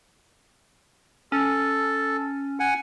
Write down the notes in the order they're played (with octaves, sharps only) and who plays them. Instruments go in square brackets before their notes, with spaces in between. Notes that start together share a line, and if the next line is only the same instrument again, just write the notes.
[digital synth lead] C#4 [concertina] A4
[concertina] F#5 G#5